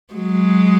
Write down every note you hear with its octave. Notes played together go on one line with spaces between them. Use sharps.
F#3 G#3